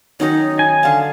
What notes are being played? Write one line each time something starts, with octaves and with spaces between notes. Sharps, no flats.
D#3 F#3 C#4 D#4
G#5
D3 F5 A5